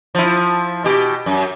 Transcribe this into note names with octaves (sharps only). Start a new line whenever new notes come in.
F3 E4
B2 G4
F#2